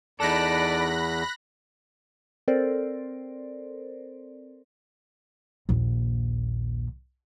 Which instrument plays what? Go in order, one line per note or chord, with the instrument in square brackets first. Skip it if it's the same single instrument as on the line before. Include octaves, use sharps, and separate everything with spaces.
[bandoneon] E2 [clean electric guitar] D#4 A4 [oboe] D5 [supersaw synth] B5 F#6 A#6
[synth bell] C4 A4 A#4 C5 D5
[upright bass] A#1 D#2